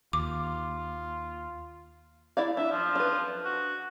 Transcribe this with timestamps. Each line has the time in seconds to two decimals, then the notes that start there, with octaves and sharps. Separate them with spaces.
0.13 D#2 F4 D6
2.37 E4 D5 F5
2.57 D4 E5
2.71 F3
2.95 D4 B4
3.45 F#4